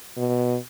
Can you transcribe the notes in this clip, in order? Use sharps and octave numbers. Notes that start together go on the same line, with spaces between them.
B2